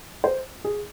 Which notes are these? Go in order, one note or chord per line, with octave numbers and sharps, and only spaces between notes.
C5
G#4